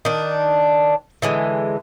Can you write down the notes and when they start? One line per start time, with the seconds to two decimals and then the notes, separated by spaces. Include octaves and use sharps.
0.05 D#3 D4
1.22 D3 E3 G#3